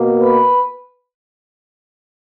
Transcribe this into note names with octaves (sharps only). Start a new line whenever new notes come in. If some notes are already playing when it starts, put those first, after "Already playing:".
Already playing: B2 A#3
B4